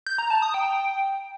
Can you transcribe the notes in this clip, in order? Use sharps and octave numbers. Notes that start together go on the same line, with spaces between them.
G6
A#5
A5
D#6
G5